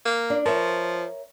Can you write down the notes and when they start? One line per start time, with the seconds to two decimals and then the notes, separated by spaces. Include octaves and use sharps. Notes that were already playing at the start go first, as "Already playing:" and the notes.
0.05 A#3
0.30 D4
0.46 F3 A#4 C#5 E5